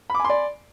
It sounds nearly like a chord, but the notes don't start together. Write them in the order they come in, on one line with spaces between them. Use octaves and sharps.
B5 D6 G#5 C6 D5